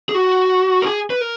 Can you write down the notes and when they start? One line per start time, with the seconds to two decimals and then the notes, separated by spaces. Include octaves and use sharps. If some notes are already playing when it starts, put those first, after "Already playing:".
0.09 G#4
0.14 F#4
0.82 A#4
0.86 G#4
1.10 B4
1.21 A#4